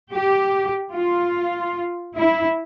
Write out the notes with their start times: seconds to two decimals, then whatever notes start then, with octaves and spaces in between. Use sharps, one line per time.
0.12 G4
0.94 F4
2.15 E4